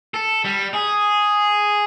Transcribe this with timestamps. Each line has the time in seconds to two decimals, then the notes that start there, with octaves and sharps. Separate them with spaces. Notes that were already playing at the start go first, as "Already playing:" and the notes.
0.14 A4
0.45 G3
0.74 G#4